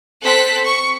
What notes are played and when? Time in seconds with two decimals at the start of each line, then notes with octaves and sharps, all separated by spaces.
0.21 C4 A4 C5 F#6 B6
0.65 C#6